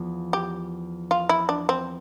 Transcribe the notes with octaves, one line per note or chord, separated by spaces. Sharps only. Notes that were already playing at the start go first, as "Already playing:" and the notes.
Already playing: E2 F3
G4
F4
E4
D4
C4